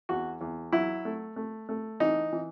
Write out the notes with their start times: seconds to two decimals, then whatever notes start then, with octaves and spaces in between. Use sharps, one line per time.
0.09 E2 F#4
0.41 E2
0.72 F#3 E4
1.05 A3
1.36 A3
1.69 A3
2.00 E3 D#4
2.33 E3